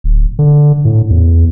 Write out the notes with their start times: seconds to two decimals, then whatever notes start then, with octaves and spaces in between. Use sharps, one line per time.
0.04 D1
0.39 D3
0.85 A2
1.10 E2